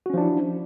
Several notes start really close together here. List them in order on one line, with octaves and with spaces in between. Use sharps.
F#4 C#4 F3 D4 E4